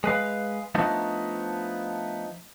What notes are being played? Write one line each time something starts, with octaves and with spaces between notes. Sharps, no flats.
G#3 B4 F5
F3 A3 B3 D4 D#4